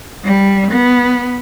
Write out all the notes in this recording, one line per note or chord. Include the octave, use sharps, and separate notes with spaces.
G3
B3